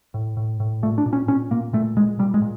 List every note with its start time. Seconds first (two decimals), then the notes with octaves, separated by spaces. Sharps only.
0.14 A2
0.37 A2
0.60 A2
0.83 A#2 A3
0.98 D4
1.06 A#2
1.13 C#4
1.28 A#2 C#4
1.51 A#2 A#3
1.73 A#2 A3
1.96 A#2 G#3
2.19 A#2 G3
2.34 G#3
2.42 A#2